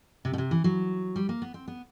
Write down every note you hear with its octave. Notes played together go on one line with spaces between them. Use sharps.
C3
B2
C3
E3
F#3
G3
A#3
B3
C4
B3